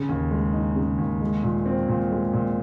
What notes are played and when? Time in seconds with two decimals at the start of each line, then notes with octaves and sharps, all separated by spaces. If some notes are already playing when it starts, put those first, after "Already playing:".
Already playing: C#3
0.09 D#2
0.31 G#3
0.54 D#4
0.76 C#3
0.98 D#2
1.21 G#3
1.43 A#2
1.66 C4
1.88 A#2
2.11 G#3
2.33 A#2